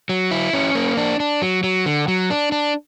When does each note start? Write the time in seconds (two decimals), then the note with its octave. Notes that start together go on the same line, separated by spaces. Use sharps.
0.09 F#3
0.31 E4
0.53 C#4
0.75 A#3
0.97 D4
1.20 D4
1.42 F#3
1.64 F#3
1.86 D3
2.08 F#3
2.30 D4
2.52 D4